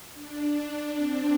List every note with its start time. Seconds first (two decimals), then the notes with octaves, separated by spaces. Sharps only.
0.13 D4
0.96 C4